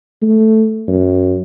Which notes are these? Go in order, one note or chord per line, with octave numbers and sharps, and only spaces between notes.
A3
F#2